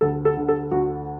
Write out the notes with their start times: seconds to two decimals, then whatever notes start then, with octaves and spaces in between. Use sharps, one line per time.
0.01 D2 A4
0.25 A4
0.37 D3
0.48 A4
0.72 D2 F#4